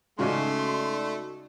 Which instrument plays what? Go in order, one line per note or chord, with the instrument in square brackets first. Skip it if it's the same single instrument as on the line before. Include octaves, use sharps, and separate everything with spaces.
[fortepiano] G#2 C#3 C#4 [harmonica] A3 [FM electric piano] D#4 F#4 D5 [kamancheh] C6